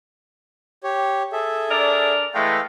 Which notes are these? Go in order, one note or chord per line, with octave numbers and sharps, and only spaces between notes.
G4 C#5
G#4 A4 E5
D4 A#4 D5
E3 G#3 A3 F5 G5